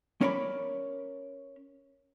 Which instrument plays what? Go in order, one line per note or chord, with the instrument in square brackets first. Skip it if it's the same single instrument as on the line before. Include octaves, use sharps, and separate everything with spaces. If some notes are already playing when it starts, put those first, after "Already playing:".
[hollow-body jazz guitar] C#4 A#4 C#5 D5 B5